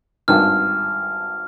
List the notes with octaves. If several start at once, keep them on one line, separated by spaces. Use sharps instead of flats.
G#1 G2 D#3 F6